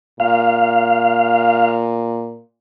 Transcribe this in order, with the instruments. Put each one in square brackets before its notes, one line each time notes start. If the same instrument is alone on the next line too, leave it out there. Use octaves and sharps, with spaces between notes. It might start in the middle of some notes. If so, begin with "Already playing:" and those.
[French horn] A#2 [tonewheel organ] F5